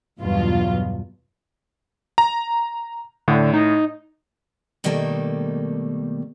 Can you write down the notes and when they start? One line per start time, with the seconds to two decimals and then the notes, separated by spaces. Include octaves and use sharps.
0.19 E2 G2 B2 F#3 F4
2.18 A#5
3.28 A2 D3
3.54 D#4
4.84 B2 D#3 G3 A3 A#3 A4